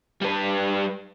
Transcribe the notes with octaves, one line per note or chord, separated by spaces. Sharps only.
G3 B4